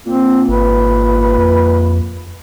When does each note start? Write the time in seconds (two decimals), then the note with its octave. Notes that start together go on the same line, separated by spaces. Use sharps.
0.06 A#2 C4
0.49 G#1 B4
1.38 F2